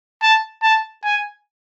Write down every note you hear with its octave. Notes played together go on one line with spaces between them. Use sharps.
A5
A5
G#5